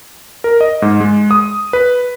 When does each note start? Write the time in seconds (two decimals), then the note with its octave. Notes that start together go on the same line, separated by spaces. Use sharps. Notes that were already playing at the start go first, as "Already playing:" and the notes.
0.44 A#4
0.61 D#5
0.82 G#2
1.00 G#3
1.31 D#6
1.73 B4